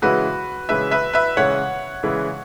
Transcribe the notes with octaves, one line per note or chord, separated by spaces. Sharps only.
C#3 E3 G#3 E4 F#4 B4
C#3 E3 G#3 E4 B4 E5
B4 E5
B4 E5
C#3 E3 G#3 E4 C#5 F#5
C#3 E3 G#3 E4